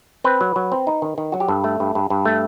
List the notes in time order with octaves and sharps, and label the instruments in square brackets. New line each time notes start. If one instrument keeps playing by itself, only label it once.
[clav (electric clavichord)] C4 B4
F#3
F#3
C4
D#4
D#3
D#3
F#3 F#4
G4
G2 A4
A3
G2
G2
G2
A3